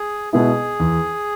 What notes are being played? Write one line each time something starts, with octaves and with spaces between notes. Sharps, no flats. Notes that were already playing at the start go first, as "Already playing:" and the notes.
Already playing: G#4
B2 G#3 B3 E4 G#4
E2